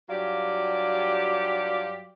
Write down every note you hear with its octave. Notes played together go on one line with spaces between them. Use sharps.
G2 F#3 F4 G4 D5 F5